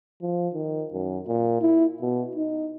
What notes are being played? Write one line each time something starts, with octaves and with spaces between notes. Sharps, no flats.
F3
D#3
F#2
A#2
E4
B2
D#4